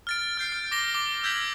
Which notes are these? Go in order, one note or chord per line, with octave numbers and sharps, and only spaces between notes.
F6 A6 D7
F6 G6 C7
F6
D6 A#6 G7
D6 G7
E6 G6 G#6 B6 F#7